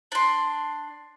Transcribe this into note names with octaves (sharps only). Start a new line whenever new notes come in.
D4 C6